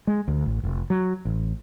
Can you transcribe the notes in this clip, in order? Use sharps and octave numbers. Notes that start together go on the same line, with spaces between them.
G#3
D2
A1
F1
F#3
A1